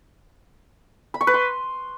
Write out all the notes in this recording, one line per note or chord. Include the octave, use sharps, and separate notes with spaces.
B5
C#6
B4
C6